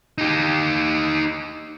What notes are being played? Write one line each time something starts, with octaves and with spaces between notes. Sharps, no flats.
D#4 G4